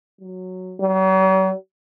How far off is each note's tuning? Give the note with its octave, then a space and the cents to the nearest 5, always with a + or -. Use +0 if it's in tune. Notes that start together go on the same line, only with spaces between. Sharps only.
F#3 -5
F#3 +45